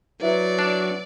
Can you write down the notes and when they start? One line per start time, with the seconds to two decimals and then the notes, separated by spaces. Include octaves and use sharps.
0.22 F#3 E4 B4 D5 E5
0.59 D4